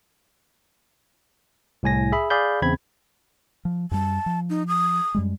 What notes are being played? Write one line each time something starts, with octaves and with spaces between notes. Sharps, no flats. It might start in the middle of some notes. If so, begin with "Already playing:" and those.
C2 A2 G#5 A#6
G#4 E5 B5
G#4 D5 F5 B5 G6
E2 C#3 C4 B5 G#6
F3
F#2 G3 A5
F3
D#4
D#6
F#2 G3 G#3